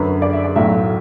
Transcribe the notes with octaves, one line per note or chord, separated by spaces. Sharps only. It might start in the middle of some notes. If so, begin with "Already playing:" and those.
Already playing: F#2 D3 F#3 B4
D5
E5
D5
B1 A2 F#3 A3 E5